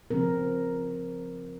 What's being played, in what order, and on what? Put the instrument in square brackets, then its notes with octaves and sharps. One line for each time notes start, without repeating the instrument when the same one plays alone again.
[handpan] C#3 F3 C4 A#4